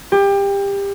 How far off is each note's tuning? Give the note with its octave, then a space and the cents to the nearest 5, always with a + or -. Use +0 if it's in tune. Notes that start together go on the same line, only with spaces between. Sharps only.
G4 +25